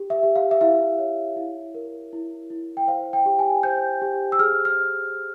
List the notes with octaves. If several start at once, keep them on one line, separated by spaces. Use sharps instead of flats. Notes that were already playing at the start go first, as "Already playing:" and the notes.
Already playing: G4
E5
G4
F5
E5
E4 F5
C#5
E4
A#4
E4
E4
G5
C5 F5
G5
G4
G#5
C5 G6
G4
E6
G#4 F6
F6